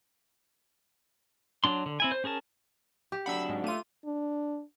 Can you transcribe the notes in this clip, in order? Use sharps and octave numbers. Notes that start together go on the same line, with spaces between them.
F#3 D4 C6
D3
C4 E4 G#5
C5
C#4 G#4 A#4 A5
G4
F#3 D4 F#5 B5 E6
G#2
A3 A#3 F4 D#7
D4